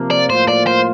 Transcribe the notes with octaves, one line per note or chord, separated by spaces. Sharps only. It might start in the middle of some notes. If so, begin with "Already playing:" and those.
Already playing: C3 F3 A#3
D5
A2 F3 A#3 F4 C5
D5
C5